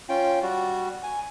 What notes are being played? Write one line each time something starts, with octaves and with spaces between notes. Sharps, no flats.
C#4 F4 G5
G3 F#4
G#5